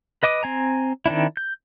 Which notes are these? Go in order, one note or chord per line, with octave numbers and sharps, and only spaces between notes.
B4 D#5 D6 D#6
C4 G#5 A#5
D#3 C4 D4 E4
G6